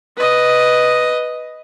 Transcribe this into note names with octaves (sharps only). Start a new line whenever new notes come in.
B4 D#5